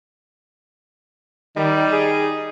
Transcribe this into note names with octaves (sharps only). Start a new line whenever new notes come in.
D#3 G3 D#4
G#4